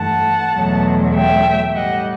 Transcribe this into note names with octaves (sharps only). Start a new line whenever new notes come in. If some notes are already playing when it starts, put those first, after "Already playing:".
Already playing: G2 E3 A3 F#5 A5
E2 B2 F#3 A3
E5 G5
A2 G3 D#5 F#5